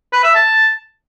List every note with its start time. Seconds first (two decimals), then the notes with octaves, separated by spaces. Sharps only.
0.12 B4
0.24 E5
0.35 A5